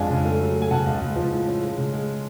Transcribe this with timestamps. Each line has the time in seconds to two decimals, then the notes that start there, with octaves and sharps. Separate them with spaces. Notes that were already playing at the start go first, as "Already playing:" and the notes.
Already playing: F2 G#3 D4 F5 G#5
0.10 C#3
0.25 A3
0.40 F#3
0.56 A3
0.62 G#5
0.71 C#3 F#5 A5
0.86 C#2
1.01 C#2
1.16 F3
1.31 A2
1.47 C#4
1.62 G#3
1.77 C#3
1.92 G#3